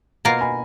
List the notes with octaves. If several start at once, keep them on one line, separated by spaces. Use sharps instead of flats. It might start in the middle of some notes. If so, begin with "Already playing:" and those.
B2 A#3 F4 A#4
G#5 B5